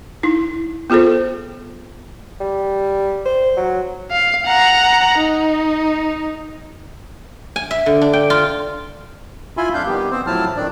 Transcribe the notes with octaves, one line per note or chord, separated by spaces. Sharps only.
D#4 E4
B3 F4 G#4 A4 C5
G3
C5
F#3
F5
F#5 A#5
D#4
G#5
E5
D3
D4
G5
F4
E4 F4 E5 G#5 B5 C6
F2 D4 F5 G6
D#3 G3 B3 G4
B3 C4 C5
A2 F3 F#3 E4 A5 F6
F2 D#3 D4 D5